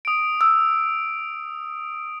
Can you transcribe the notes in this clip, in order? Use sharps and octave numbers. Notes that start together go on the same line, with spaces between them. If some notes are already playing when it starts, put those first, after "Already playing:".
D#6 D7
E6